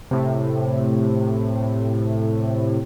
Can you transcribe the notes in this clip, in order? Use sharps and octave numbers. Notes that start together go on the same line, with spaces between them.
A2 C3